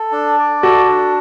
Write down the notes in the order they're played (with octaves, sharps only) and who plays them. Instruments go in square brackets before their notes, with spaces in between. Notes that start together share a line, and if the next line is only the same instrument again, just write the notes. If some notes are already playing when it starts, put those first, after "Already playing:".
Already playing: [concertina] A4
D4
D5
[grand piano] F#4 [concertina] A4
[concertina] D4